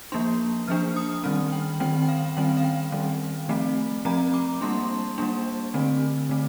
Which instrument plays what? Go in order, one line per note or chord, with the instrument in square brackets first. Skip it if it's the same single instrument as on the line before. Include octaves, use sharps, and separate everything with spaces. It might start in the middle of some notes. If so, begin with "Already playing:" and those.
[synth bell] F3 A#3 D4 C6
F3 A#3 D4 F6
D#6
D#3 G3 C4 F6
G5
D#3 G3 C4 G5
G5
F5
D#3 G3 C4 G5
F5
G5
D#3 G3 C4
F3 A3 C4
F3 A3 C4 A#5
D6
G3 A#3 D4 C6
G3 A#3 D4
D3 A3 C4
D3 A3 C4